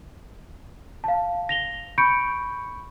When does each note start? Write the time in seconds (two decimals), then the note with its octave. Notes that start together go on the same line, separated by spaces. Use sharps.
1.04 F5 A5
1.49 A#6 F7 G7
1.98 B5 C#6 G6 C#7 D7